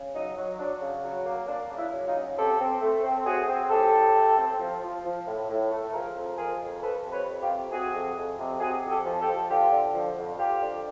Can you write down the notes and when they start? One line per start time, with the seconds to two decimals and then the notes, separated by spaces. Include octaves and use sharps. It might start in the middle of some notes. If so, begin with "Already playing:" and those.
Already playing: C#3
0.14 F#3 D#4
0.36 F#3
0.58 F#3 D4
0.81 C#3
1.03 F#3
1.25 A#3
1.48 A#3 D4
1.70 C#3
1.77 D4 E4
1.92 F#3
2.07 D#4 F4
2.15 C#3
2.37 C4 G4 A4
2.59 C4
2.81 A3
3.04 C4
3.26 A3 F#4 G#4
3.48 C4
3.70 A2 G4 A4
3.93 A2
4.15 A3
4.38 C4
4.59 F3
4.82 F3
5.04 F3
5.26 A2
5.49 A2
5.71 A3
5.93 F3 G#4 A#4
6.15 F2
6.38 F3 G#4 A#4
6.60 F2
6.82 F3 A4 B4
7.04 C3
7.12 B4 C#5
7.27 F2
7.42 F4 G4
7.49 C3
7.71 C3 F#4 G#4
7.94 F2
8.16 F2
8.39 C3
8.60 C3 F#4 G#4
8.83 F2
8.90 G4 A4
9.05 F3
9.20 G4 A4
9.28 F3
9.50 D3 F4 G4
9.72 D3
9.94 F3
10.17 F2
10.39 F2 F4 G4
10.61 D3